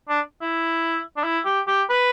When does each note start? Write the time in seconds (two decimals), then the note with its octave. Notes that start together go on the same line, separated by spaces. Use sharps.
0.09 D4
0.41 E4
1.17 D4
1.24 E4
1.45 G4
1.68 G4
1.90 B4